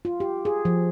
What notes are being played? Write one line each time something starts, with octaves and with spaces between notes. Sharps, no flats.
F4
G4
G#4
F3